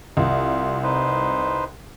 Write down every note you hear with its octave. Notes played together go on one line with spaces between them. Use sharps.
C2 F4
D#4 B4 C5